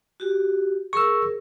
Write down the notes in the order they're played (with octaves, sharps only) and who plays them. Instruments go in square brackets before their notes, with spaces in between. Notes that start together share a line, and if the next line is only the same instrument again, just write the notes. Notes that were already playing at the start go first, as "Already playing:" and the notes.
[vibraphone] F#4 G4
[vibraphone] G#4 A#4 [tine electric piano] C#6 E6